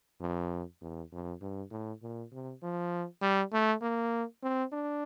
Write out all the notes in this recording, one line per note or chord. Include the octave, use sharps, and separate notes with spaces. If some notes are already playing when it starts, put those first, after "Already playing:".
F2
E2
F2
G2
A2
A#2
C3
F3
G3
A3
A#3
C4
D4